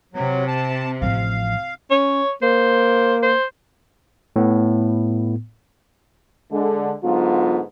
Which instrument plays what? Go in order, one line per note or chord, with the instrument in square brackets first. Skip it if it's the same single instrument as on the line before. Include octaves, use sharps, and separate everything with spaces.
[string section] C3 [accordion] F#3
[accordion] A5
[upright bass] A1 F3 [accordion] F5
[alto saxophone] C#4 [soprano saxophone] C#5
[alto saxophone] A#3 [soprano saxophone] C5
[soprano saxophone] C5
[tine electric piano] A2 B3
[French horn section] D3 G#3
G#2 D3 F#3 B3 F4